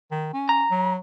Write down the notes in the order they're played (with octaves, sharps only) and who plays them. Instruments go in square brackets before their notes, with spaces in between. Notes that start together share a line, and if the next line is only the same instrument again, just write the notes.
[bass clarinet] D#3
C#4
[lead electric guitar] A#5
[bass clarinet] F#3